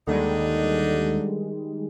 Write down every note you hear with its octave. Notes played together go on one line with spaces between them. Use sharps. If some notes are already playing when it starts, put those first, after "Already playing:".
D#2 D3 D#3 G3 G#3 D4 D#4